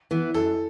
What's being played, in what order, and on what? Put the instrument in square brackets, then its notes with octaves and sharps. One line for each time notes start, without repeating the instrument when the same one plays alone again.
[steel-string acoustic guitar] E3 B3
[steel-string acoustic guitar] F#2 [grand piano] A4